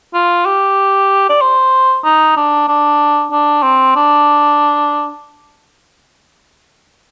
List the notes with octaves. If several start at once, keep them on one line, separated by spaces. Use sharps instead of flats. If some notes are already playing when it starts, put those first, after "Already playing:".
F4
G4
D5
C5
D#4
D4
D4
D4
C4
D4